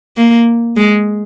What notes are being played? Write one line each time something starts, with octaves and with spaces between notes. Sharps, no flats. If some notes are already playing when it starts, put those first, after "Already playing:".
A#3
G#3